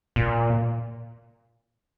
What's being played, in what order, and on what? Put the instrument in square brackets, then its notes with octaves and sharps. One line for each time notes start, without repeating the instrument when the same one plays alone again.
[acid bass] A#2